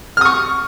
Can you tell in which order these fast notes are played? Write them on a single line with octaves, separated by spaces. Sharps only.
F6 D#6 C#6